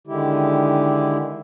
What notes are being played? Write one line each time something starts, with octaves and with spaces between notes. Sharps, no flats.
D3 D#3 G#3 E4 G4